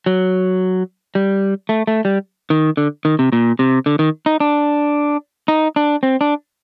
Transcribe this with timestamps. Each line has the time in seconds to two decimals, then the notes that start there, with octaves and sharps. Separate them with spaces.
0.06 F#3
1.15 G3
1.69 A3
1.87 A3
2.05 G3
2.50 D#3
2.77 D3
3.05 D#3
3.19 C3
3.32 A#2
3.59 C3
3.86 D3
3.99 D#3
4.26 D#4
4.40 D4
5.48 D#4
5.76 D4
6.03 C4
6.21 D4